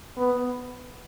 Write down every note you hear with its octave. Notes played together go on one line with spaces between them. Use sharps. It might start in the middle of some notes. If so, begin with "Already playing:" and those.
B3